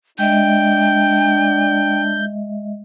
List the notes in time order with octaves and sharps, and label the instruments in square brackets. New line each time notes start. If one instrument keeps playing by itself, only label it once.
[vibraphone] G#3 D#5 E5 [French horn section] D4 [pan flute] G5 [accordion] G6